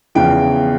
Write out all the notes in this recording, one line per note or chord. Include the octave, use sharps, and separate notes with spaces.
E2 C#3 F3 G5